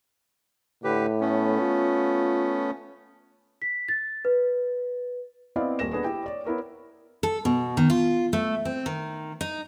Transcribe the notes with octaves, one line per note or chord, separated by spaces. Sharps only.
A2 D3 G4 B4
A3 B3 C#4
F4
B6
A6
B4
B3 C4 E4 D5 D#5 F5
D#1 A#4 A#6 E7
B3 D4 G#4 B4
E4 G4 G5
C#5 D5
B3 E4 A#4 C#5
A4
B2
D#3
F4
A3
C4
D#3
D#4